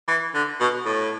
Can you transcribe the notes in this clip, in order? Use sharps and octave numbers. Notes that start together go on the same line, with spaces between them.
E3
D3
B2
A2